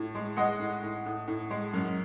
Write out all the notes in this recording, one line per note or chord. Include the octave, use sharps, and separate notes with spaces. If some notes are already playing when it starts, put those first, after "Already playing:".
Already playing: A2
G#3
G#3 D#5 F#5
A2
A2
A2
A2
G#3
F#2